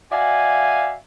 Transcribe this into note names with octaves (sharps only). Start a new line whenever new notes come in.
F#4 D5 E5 F5 G#5